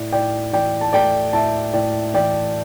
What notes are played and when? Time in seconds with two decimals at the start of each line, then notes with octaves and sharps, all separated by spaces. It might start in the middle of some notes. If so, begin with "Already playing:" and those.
Already playing: A2 D5
0.12 A2 D5 G5
0.53 E3 D5 G5
0.81 A5
0.93 A3 D5 G5
1.33 A2 E5 A5
1.73 A2 D5 G5
2.14 E3 D5 G5